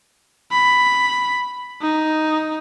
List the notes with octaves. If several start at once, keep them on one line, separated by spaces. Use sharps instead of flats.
B5
D#4